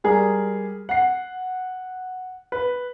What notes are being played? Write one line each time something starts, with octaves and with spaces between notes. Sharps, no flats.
G3 G#3 G#4 A#4
F#5 C7
B4